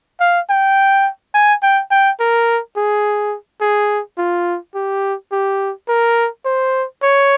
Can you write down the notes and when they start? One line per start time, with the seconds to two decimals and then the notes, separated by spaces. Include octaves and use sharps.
0.20 F5
0.50 G5
1.34 G#5
1.62 G5
1.91 G5
2.20 A#4
2.77 G#4
3.61 G#4
4.18 F4
4.75 G4
5.32 G4
5.89 A#4
6.45 C5
7.03 C#5